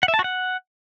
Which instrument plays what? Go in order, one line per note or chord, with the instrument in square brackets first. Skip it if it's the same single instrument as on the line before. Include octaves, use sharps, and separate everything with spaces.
[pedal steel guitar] F#5
E5
A5
F#4
F#5